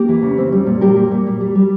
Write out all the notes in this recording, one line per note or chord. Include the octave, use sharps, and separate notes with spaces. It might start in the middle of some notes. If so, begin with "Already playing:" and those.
Already playing: A#3 G4
E3
C#3
C4
G3
A#2
G3 G4 A#4
A#2
A#2
G3
G3
G3